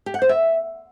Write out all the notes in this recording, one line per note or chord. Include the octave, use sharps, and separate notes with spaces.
G4
F#5
C5
E5